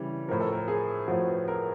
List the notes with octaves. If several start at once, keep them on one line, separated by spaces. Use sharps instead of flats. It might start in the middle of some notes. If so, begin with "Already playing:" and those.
Already playing: C#3 E3 G3
A2 F3 A#4
A4
A#4
G#4
A2 F3 F#4
B4
A#4